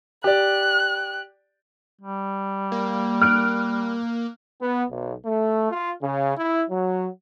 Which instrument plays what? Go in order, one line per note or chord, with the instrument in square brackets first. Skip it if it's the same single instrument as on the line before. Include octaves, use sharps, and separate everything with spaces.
[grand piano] G4 D5 [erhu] F#6
[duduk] G3
[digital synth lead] A#3
[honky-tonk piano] F6 F#6 D7
[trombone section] B3
B1
A3
F4
C#3
E4
F#3